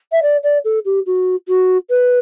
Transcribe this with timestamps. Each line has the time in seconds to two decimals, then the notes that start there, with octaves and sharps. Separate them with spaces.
0.12 E5
0.22 D5
0.43 D5
0.64 A4
0.85 G4
1.06 F#4
1.48 F#4
1.90 B4